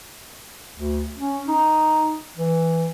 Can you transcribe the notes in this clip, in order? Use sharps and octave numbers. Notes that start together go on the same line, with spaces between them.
D2
C#4
D#4
E3